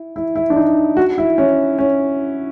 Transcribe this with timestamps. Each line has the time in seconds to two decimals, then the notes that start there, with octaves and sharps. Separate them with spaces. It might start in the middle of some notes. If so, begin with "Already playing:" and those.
Already playing: E4
0.16 E4
0.36 E4
0.50 D4
0.56 D#4
0.97 F#4
1.18 E4
1.38 C#4
1.79 C#4